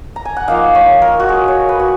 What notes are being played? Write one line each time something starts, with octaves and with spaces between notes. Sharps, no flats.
A#5
G#5
F#5
F3 A#3 D#4 F5
C#5
A#4
F#4
G#4
C#5
B4
F#4